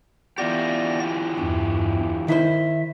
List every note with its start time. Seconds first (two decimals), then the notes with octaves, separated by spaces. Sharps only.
0.38 E3 B3 F4 G4 D5 A#6
1.39 E2 G2
2.28 D#3 E4 C5 E5